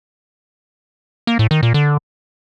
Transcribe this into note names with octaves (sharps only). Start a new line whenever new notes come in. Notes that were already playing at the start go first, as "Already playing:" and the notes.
A#3
A2
D#3
A#2
D3